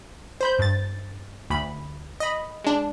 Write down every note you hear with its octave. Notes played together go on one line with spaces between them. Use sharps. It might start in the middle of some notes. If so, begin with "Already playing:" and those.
C5 B5 G6
G2 A6
D2 B5
D#5 B5
G#3 D4